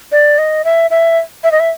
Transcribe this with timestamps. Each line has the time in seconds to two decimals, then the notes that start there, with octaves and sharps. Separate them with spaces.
0.12 D5
0.38 D#5
0.65 E5
0.91 E5
1.44 E5
1.52 D#5
1.60 E5